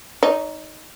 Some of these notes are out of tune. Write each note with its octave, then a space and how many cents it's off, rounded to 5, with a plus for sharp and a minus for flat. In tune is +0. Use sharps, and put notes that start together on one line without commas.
D#4 +0 C#5 +45